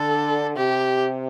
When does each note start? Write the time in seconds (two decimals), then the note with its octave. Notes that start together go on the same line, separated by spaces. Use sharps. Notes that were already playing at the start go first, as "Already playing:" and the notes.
Already playing: D3 A4
0.56 C3 G4